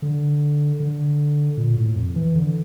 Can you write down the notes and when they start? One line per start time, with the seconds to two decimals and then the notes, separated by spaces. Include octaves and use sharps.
0.02 D3
0.80 D3
1.57 A#2
1.77 A2
1.96 F2
2.16 E3
2.35 D3